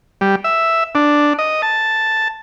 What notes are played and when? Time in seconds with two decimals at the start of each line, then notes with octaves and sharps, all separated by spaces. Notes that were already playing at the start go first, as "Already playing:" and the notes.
0.21 G3
0.44 E5
0.95 D4
1.39 D#5
1.62 A5